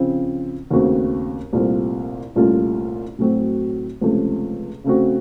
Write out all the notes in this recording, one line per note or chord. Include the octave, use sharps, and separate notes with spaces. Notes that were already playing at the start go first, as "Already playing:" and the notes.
Already playing: C#3 F3 C4
D#2 C#3 A3 C4 F#4
C2 A#2 A3 C4 F4
C2 A#2 A3 C#4 F4
A2 F#3 A3 C4 F#4
C#2 C3 F3 A3 C#4
C#3 A3 C4 F#4